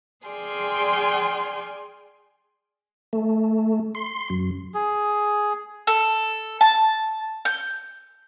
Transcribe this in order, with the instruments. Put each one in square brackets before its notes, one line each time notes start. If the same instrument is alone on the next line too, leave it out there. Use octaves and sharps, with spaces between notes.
[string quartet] G#4 D5 G5 G#5 C6 F6
[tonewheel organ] A3
C6
F#2
[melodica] G#4
[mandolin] A4
A5
G6